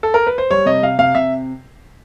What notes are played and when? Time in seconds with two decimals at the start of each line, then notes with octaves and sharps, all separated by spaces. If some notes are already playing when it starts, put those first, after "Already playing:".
0.03 A4
0.14 A#4
0.27 B4
0.38 C5
0.51 G3 C#5
0.66 C3 D#5
0.83 C3 F5
0.99 C3 F5
1.15 C3 E5